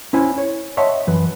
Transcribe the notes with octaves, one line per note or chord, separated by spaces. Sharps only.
C#4 E4 C5 G#5
C#5
C#5 D#5 E5 F#5 A5 C6
F#2 E3 B4